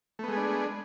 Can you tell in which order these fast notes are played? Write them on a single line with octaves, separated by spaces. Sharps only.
A3 B3 G#3 G#4 D4